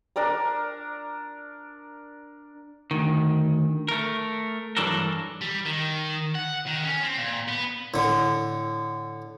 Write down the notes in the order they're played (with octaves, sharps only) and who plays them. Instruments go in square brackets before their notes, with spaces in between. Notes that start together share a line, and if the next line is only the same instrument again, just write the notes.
[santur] D4 A#4 D5 A#5
[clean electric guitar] D2 D#3
A3 A#4
G2 E3 F#3 D4 A4 A#4
[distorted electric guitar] G3
D#3
F#5
D#3
C#4
C4
A#2
B3
[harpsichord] A2 D3